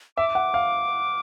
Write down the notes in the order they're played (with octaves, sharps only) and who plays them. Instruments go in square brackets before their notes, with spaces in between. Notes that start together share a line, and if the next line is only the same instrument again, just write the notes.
[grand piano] E5 [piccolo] D6
[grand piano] F#5
F5